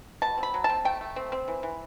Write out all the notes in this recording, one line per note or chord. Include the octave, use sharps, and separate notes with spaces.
B2 A5
C4
B5
F#3
A5
C4
A3 G5
A3
C4
C4
E3
E3